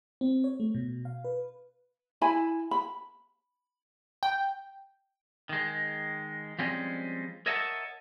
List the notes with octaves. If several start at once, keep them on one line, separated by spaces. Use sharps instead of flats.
C4
C#5
A3
B2
F5
B4
E4 G#5 B5
B5
G5
D#3 G#3
F3 G3 G#3 C4 C#4
A#4 C#5 D#5 E5 F#5 A5